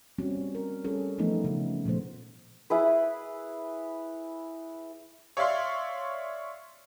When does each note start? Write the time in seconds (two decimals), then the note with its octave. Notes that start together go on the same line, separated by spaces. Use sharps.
0.18 G3 A#3 C4 C#4 F#4
0.55 A#4
0.84 G3 C#4 G#4 A4
1.18 E3 F3 A3 B3 D#4
1.44 C#3 D#4
1.86 A#2 F3 A3 B3 C5
2.70 E4 G#4 B4
5.37 C#5 D5 E5 F5 C6